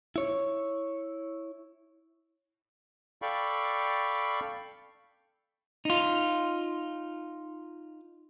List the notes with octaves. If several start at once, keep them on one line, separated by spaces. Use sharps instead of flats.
E4 C#5
A4 D5 F5 G5 B5 C#6
D#4 F4